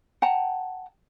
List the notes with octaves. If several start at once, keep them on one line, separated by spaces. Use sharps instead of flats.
F#5 G5 A5 A#5